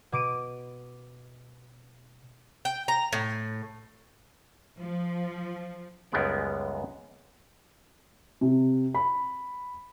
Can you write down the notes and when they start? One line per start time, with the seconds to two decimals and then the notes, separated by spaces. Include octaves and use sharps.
0.12 B2 D6 D7 D#7
2.65 G5
2.88 A#5
3.13 A2
4.78 F3
6.12 C#2 F#2 G3 G#3 B3 D5
8.41 C3
8.95 B5